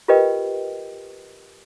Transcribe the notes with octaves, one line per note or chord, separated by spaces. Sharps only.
F4 G4 A#4 B4 D#5 G5